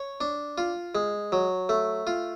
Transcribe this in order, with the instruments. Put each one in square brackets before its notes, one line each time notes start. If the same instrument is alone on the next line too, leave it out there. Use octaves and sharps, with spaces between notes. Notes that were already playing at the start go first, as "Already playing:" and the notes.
Already playing: [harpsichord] C#5
D4
F4
G#3
F#3
A3
F4